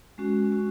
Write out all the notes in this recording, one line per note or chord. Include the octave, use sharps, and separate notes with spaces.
G#3 C#4 F#4
G#3 C#4 F#4